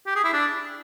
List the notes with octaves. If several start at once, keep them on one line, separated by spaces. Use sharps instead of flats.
G4
G#4
E4
D4